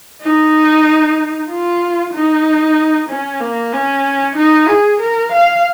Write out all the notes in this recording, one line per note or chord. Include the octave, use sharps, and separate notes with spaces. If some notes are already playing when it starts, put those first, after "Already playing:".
D#4
F4
D#4
C#4
A#3
C#4
D#4
G#4
A#4
F5